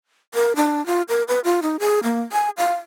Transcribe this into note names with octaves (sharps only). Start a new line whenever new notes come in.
A#4
D4
F4
A#4
B4
F4
D#4
G#4
A#3
G#5
F5